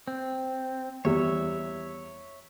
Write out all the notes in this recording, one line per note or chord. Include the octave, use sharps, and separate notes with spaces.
C4
E2 G3 C#5 E5